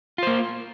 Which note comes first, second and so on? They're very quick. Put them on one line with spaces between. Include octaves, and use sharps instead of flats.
F4 C5 A#3